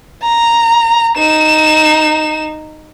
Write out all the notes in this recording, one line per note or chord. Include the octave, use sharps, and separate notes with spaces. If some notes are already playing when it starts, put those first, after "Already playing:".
A#5
D#4 E7